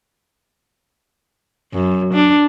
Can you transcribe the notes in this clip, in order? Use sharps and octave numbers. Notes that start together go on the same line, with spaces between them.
F#2
D4